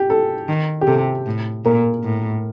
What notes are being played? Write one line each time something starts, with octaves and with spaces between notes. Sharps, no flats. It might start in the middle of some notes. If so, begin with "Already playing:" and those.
Already playing: G4
A4
D#3
G4
C3 A4
A2
A#2 A#4
A2